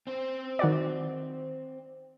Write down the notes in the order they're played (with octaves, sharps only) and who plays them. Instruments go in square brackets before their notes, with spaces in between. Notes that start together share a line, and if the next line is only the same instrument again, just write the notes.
[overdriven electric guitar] C4 C5
[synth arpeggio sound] D#3 F#4 D5